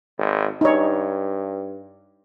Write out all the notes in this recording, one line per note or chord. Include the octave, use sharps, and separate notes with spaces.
G#1
G2 D#4 C#5